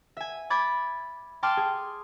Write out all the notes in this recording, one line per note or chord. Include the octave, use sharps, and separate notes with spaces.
E5 G#5
B5 D6 G#6 A6
G5 A5 C6 D6 F6
G#4